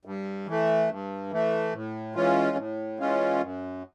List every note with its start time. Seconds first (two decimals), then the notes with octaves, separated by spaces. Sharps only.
0.05 G2
0.47 E3 A3
0.90 G2
1.31 E3 A3
1.73 A2
2.15 E3 G#3 C#4 F4
2.57 A2
2.99 E3 G#3 C#4 F4
3.41 F#2